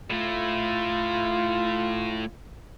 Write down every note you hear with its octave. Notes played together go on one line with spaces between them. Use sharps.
A2 A3 F4